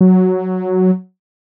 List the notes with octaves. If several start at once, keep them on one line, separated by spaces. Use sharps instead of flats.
F#3